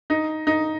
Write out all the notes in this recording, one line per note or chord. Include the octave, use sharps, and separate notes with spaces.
D#4
D#4